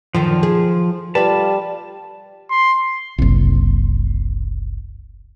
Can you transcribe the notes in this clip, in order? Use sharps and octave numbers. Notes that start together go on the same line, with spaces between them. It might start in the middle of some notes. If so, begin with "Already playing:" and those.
F#2 D3 D#3 F3
G#4
G3 F4 B4 A5
C6
F#1 C2